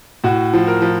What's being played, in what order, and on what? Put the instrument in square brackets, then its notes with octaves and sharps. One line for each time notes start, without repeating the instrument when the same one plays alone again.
[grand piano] A2 F#4
F3
A#4
F3